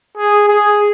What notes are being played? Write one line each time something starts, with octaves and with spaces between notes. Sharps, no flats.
G#4
G#4